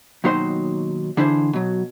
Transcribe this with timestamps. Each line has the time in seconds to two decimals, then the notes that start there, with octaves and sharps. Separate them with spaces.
0.24 D#2 B2 F#3 D#4 C5 C6
1.17 D3 E3 D4 E4 G#4 C5
1.53 B2 F#3